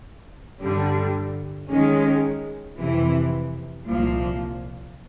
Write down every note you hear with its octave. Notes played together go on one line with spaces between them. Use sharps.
G2 D3 G3
D#3 G#3 C#4
F2 C3 E3
C2 A#2 F3